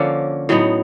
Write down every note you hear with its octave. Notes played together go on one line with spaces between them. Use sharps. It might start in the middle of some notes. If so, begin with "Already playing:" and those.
Already playing: D3 F3 A#3 C#4
A2 F#3 B3 D#4